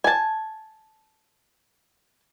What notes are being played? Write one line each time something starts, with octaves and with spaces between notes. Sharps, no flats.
G#5 A5